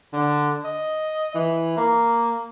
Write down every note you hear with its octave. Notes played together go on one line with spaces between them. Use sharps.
D3
D#5
E3
A#3